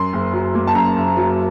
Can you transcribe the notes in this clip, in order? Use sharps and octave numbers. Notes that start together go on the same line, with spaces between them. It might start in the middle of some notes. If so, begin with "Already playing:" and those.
Already playing: F#2 C6
F#1
F#3
A#3
A5
F#2 A#5
F#1
F#3